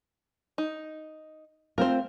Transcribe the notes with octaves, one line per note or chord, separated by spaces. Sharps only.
D#4
A3 C4 F4 A#4 C5